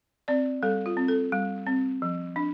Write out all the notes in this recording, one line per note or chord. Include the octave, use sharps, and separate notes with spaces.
C4 D5
G3 A4
F4
C4
A4
G3
C4
F3
D4